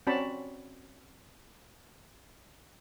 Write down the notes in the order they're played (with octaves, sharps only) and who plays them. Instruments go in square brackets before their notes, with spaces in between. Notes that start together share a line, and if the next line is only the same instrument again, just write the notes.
[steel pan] C4 C#4 F#4 D5 A5 B5